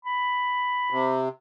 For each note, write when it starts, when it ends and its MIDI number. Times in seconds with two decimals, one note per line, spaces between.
0.05 1.17 83
0.90 1.29 48